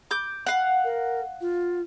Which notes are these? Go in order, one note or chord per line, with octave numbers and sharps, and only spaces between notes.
D6 G6
F5 F#5
A#4
F4